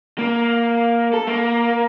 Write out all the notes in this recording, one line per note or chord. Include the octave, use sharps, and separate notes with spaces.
A#3
A4
A#3